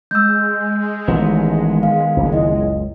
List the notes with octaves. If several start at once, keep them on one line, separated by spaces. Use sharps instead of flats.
G#3 E6 G6
A1 D#3 B3
F5
F#1 C#2
E4 D#5